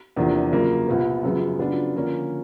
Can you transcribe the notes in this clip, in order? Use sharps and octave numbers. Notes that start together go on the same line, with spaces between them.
E2 C3 F3 A#3 D4
F#2 C#3 F3 A#3
C2 A#2 G3 B3
F#2 C#3 F3 G#3 B3
C#3 F#3 B3 D4 F4
D3 F3 A#3 C#4 F4